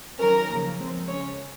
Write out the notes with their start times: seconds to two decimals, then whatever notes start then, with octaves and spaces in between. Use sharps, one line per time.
0.19 D#3 F#3 C#4 A#4
0.49 C#3 F3 A#3
0.78 F3 G#3 C4
1.07 C#3 G#3 C#4 C#5